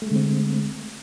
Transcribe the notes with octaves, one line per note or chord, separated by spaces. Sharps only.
D3 G#3 A3 C4